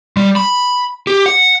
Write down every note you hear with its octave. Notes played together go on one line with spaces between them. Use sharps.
G3
B5
G4
F#5